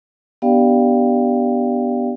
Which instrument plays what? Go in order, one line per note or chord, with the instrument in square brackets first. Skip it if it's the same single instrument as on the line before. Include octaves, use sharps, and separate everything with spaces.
[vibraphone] B3 D4 G4 D5 F5 G5